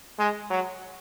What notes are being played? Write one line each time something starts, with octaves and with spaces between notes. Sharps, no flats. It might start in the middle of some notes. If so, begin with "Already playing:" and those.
G#3
F#3